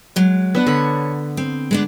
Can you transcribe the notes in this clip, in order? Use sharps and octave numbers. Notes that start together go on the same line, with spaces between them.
F#3 G#3
B3 D4 F#5
D3 C#5 B5
C4
G#3 B3 D4